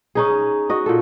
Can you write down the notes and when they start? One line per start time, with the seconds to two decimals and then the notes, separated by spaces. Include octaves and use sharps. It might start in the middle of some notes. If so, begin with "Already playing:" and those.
0.15 C#4 D#4 G#4
0.70 F#4 D#5
0.86 A#2 A4